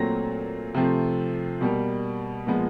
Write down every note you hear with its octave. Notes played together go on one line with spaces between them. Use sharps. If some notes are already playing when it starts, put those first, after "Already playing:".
Already playing: A#2 F#3 A3 C4 A#6
C3 F3 A3 C4
B2 G3 A#3
A#2 F3 G#3 B3